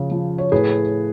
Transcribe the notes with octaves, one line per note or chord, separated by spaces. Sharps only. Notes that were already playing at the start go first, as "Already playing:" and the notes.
Already playing: C#3 F3
F3
C#5
A2 G#4 B4